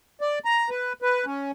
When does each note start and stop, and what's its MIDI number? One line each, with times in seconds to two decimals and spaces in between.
0.21 0.39 74
0.45 0.70 82
0.70 0.93 71
1.02 1.25 71
1.26 1.52 61